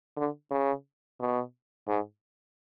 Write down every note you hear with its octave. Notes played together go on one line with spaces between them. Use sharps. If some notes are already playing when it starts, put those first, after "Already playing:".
D3
C#3
B2
G#2